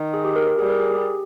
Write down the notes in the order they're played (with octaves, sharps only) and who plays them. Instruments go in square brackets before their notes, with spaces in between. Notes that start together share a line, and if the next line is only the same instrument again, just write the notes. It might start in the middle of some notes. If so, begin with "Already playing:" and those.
Already playing: [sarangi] D#3
[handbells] G#4
G4
A#4
A#4
[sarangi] G3 [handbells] G#4
[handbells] A#4
G#4
G4